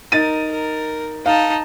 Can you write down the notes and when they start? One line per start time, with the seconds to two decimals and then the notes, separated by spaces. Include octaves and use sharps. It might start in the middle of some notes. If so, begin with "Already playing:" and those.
0.12 D#4 A#4 A6 D#7
0.52 A#4
1.26 D#4 F5 A5